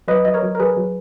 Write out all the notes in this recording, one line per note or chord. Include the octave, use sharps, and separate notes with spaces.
F#3 B4 D#5
F#3 D#5
A#4 C#5
F#3
A#4
F#3 G#4 B4
F#3